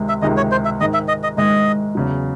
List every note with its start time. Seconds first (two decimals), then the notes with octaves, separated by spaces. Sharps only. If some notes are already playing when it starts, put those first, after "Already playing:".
Already playing: C#2 C3 D#3 G#3
0.09 E5
0.22 C#2 C3 D#3 G#3 D#5
0.37 C#5
0.52 C5
0.65 E5
0.80 G#2 D#3 G#3 D#5
0.94 E5
1.08 D#5
1.23 D#5
1.37 G#2 D#3 G#3 D#5
1.95 E2 C#3 F#3